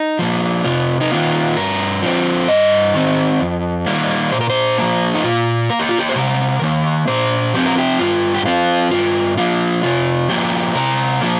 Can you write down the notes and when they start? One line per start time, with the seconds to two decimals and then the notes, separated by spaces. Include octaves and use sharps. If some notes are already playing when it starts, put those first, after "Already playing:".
Already playing: D#4
0.19 F3 A#3
0.65 C3 F4
1.01 D#4
1.11 D#3 A#3 F4
1.57 G2 A#4
2.02 F3 C4
2.48 G2 D#5
2.94 D#3 C4
3.40 F2
3.86 D#3 G3 A#3
4.32 A#2 C5
4.41 A#4
4.50 C5
4.78 F3 A#3
5.14 D#4
5.24 A#2 F4
5.70 A#3 A#4
5.79 G4
5.89 F4
5.98 G4
6.09 C5
6.16 C3 A#4
6.62 D#3 A#3
7.08 A#2 C5
7.54 F3 C4 G4
7.66 A#4
7.78 G4
7.99 G2 F4
8.34 G4
8.46 F3 C4 F4
8.91 G2 F4
9.37 F3 A#3 F4
9.83 C3 F4
10.29 F3 A#3 G4
10.75 C3 A#4
11.21 F3 A#3